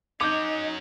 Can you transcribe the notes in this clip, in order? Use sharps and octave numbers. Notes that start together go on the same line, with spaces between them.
F#3 C#4 D#4 D#5 D6 G6